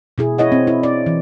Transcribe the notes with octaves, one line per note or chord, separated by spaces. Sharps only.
B2 E4 G#4
E4 C#5 D#5 F#5
C4
E4
D5
E3